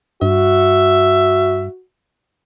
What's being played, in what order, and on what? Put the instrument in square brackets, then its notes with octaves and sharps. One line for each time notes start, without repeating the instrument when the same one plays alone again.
[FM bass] G2 [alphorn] F#4 [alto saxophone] E5